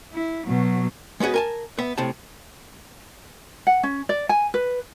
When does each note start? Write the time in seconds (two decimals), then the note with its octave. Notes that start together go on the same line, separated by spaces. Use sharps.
0.13 E4
0.48 B2 F#3
1.20 G#3 B3 C#4 F#4 G#4
1.34 A#4 G#5 A5
1.79 B3 E5
1.98 A2 C3 A5
3.67 F#5
3.83 C#4
4.09 D5
4.29 G#5
4.54 B4